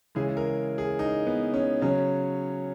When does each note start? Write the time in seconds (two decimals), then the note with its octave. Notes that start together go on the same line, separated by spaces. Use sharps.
0.15 C#3 E3 G#3 G#4
0.37 A#4
0.78 G#4
0.99 D#4
1.27 B3
1.54 C#4
1.82 C#3 F#3 C#4